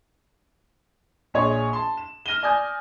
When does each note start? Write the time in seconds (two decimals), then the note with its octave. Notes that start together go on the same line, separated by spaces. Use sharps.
1.34 A#1 G#4 C#5 D#5 C6
1.73 A5 C6
1.97 E7
2.26 F6 A#6 D#7 E7 G7
2.42 D5 G#5 D#6 G6